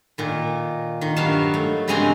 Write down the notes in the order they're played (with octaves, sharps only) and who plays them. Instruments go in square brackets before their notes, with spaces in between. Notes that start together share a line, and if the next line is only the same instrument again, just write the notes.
[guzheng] A#2 D#3
D#3
G2 F#3 B3 F5 A5
A3
G2 C#3 G#3 C4 G#5 A#5